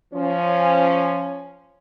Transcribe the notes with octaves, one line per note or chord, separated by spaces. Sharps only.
F3 C#4